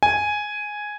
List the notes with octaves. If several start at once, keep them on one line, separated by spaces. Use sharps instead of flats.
G#5